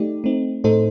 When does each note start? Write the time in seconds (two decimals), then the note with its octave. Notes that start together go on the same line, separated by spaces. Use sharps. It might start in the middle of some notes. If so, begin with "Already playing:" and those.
Already playing: A3 D#4 G4 D5
0.24 A3 C4 D#4
0.64 A2 A3 D#4 A4 C5